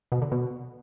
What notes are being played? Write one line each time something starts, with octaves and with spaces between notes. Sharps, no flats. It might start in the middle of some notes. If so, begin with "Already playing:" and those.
B2
D3
B2